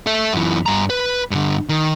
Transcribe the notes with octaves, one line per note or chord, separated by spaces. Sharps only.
A4 E5
F#2 E3
G2 A#5
B4
G2 D3
D#3